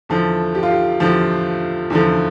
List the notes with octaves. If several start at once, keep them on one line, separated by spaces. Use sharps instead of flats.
E2 D3 F3 A4
G4
F4
G4
E2 D3 F3 G4
E2 D3 F3